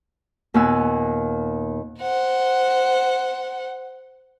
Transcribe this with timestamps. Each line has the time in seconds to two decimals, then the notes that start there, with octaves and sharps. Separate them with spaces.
0.54 D#2 A#2 B3 G#5 E6
2.00 C5 F#5